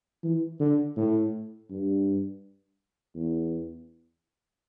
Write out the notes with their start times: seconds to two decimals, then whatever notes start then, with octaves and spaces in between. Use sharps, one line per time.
0.24 E3
0.60 D3
0.96 A2
1.70 G2
3.15 E2